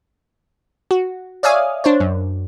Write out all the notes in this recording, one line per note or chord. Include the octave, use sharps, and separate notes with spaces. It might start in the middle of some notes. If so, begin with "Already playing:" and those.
F#4
C#5 D5 E5 F5 G#5 D#6
D4 C5 C#5
F#2